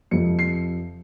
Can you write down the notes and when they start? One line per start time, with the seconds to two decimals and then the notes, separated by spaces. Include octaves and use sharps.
0.11 F2 C3 F3 C#7
0.39 C7